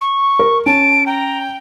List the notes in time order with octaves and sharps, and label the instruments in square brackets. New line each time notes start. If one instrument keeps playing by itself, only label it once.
[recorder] C#6
[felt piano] A#4
[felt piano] C#4 [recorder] A5 [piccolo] D7
[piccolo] G5 [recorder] A#5